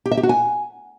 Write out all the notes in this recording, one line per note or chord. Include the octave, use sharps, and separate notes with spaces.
G4
E5
G4
F#4
G#5